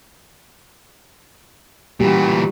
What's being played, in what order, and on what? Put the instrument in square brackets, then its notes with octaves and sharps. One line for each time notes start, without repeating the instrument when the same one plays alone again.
[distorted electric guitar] A#2 E3 [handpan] G3 F#4 G4